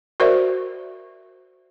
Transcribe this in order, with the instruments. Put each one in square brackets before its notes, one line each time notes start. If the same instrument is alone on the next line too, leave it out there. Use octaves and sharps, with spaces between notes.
[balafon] F#4 A#4 C5 D5 E5